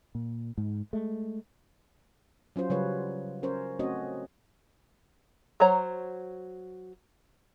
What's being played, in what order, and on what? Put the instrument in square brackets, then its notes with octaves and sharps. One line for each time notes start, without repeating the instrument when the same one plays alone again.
[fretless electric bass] A#2
G#2
G#3 A3
[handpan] F#3 C#4 F4 C5
C#3 F#3 G3 F4 B4 C#5
C#4 A#4 C5 C#5
A3 C4 C#4 F#4 C#5 D#5
[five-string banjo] F#3 C5 C#5 A#5